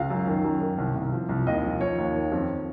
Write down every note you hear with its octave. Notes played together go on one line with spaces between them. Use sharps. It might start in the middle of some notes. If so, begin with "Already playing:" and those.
Already playing: C#2 F5
F#2
D#3
F#2
D#3
C2
C2
F3
C2
D#2 D#5
F3
F3 C#5
D#2
D#3
F2